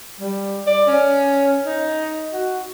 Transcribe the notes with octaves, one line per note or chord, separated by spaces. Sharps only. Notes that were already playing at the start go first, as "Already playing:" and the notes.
G3
D5
C#4
D#4
F#4